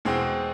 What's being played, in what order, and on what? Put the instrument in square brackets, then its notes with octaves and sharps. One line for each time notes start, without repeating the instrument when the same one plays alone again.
[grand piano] E2 B2 G#3 C4